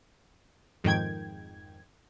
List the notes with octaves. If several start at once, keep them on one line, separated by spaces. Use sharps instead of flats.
F2 G#2 D#3 G5 G#6